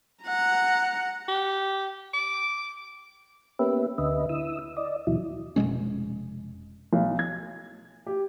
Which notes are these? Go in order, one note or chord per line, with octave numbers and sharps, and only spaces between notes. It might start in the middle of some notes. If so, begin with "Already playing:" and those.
F#5 A#5
G4
D6
A#3 B3 C#4 G4 B4 E5
D2 D3 B4 D#5 E5
E4 D#6 E6
D5 D#5
D#2 B2 E3 F#3 E4
F1 B2 G#3 C#4
B1
G#6
G4